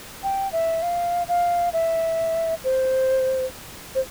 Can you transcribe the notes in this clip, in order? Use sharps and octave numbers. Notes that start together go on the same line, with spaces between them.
G5
E5
F5
F5
E5
C5
C5